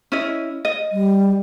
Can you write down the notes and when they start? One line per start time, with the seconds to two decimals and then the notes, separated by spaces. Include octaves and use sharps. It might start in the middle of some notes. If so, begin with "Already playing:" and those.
0.12 C#4 E4 D#5
0.65 D#5
0.92 G3